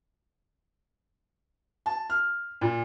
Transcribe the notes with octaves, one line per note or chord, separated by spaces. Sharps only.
A5
F6
A#2